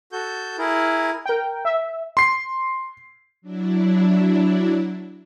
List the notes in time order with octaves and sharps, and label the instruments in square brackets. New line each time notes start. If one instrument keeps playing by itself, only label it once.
[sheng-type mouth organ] F#4 A4 G6
E4 G#4 A#4
[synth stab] A#4 G5
E5
[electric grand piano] C6 C7
[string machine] F#3 D4 E4